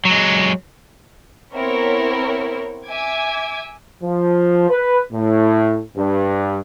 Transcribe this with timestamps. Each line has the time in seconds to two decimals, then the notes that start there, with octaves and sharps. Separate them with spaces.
0.05 F#3 G#3
1.53 B3 C4 E4 A#4 C#5
2.87 E5 G#5 D6 G#6
4.03 F3
4.70 B4
5.12 A2
5.97 G2